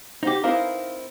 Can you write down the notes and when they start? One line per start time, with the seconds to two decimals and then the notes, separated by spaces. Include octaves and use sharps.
0.23 D#4 G4 C5 F#5
0.44 C4 D#4 E4 A#4 B4 F5